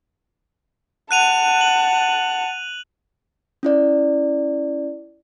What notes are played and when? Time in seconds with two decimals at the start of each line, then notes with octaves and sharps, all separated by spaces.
1.11 F#5 A5 F#6 D#7 F7
1.61 F#7
3.63 C#4 E4 D5